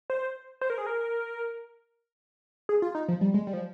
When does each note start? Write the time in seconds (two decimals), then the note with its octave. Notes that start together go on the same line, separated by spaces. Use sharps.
0.10 C5
0.61 C5
0.70 A#4
0.78 G#4
0.87 A#4
2.69 G#4
2.82 F4
2.95 D#4
3.08 F3
3.21 G3
3.34 G#3
3.47 G3
3.53 F3